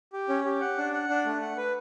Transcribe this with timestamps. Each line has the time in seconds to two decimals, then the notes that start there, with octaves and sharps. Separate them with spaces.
0.13 G4
0.29 C#4
0.45 G4
0.61 F#5
0.77 D4
0.93 F#5
1.09 D4
1.25 A3
1.41 F#5
1.57 B4